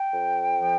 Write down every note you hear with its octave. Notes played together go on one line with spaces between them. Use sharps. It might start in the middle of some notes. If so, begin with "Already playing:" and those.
Already playing: G5
F2
F3